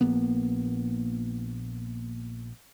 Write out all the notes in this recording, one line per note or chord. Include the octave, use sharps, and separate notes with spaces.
A#1 A#3 B3